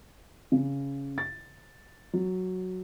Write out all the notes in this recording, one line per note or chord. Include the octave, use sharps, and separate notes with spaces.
C#3
A6
F#3